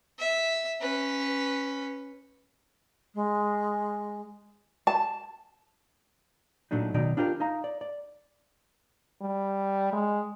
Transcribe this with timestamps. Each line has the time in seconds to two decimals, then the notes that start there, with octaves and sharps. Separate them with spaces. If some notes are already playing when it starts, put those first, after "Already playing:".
0.19 E5
0.81 C#4 B4
3.14 G#3
4.87 A5
6.71 A#2 F#3 A3 D4 D#4
6.94 B2 D#3 F#3 D#4 D5
7.17 D4 F4 G4 A4 A#4
7.40 D#4 D#5 F5 A#5
7.64 D5
7.81 D5
9.22 G3
9.92 G#3